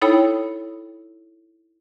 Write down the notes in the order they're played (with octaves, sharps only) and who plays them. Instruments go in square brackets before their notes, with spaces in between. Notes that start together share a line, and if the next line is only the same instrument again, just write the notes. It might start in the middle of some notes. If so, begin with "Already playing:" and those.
[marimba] D#4 E4 A4 C#5 G5 B5